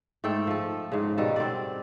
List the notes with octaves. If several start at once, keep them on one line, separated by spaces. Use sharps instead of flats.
G#2 A3 A4 G5
F3 A4
G#2 C#3
B2 D#3 G3 A4
C4 D5